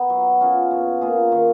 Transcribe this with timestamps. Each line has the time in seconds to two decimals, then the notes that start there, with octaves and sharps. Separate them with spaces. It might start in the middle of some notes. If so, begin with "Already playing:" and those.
Already playing: B3 D#4
0.10 F#3
0.41 C#4 F4 G#4
0.71 B2
1.01 A#3 F4 G#4
1.32 D#3